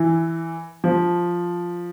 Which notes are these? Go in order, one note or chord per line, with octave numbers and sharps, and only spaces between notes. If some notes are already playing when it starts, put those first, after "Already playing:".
Already playing: E3
F3